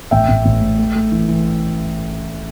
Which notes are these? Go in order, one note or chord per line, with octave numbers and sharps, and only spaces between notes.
A1 E5 G5
A1
A1
A2
A3
A3
E3
E3